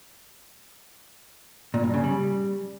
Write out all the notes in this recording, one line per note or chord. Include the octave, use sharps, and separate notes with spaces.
A#2
G2
C#3
G3